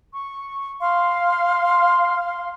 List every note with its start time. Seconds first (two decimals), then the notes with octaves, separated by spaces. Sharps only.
0.13 C#6
0.81 F5 C6